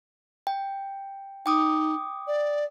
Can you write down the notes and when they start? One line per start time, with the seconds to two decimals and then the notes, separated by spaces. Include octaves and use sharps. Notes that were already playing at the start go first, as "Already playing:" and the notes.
0.47 G5
1.46 D#4 G5 D6 D#6
2.27 D5